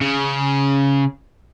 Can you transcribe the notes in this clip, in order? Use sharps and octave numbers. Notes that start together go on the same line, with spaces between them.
C#3